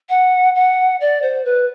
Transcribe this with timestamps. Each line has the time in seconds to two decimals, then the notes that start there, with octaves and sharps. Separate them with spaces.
0.09 F#5
0.55 F#5
1.00 D5
1.22 C5
1.44 B4